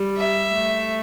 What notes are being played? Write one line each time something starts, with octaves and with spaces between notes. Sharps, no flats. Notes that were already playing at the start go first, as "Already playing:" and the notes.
Already playing: G3
E5
A3